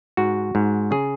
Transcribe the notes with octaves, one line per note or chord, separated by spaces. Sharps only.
G#2 F#4
G#2
C#3 G#4